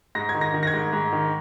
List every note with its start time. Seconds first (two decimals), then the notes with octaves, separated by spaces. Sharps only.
0.15 G#2 A#6
0.29 G#6
0.34 D#3
0.41 A#6
0.54 D#3
0.63 A#6
0.67 G#6
0.74 G#2
0.93 G#2
1.13 D#3